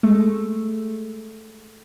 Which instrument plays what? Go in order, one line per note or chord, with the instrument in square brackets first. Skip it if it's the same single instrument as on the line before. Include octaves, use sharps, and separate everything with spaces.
[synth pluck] G#3 A3